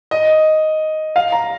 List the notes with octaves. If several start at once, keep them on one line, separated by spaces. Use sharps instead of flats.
D#5
F5
A#5